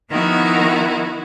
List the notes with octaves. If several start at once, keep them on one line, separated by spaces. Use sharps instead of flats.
D#3 F3 B3 E4 F#4 A#4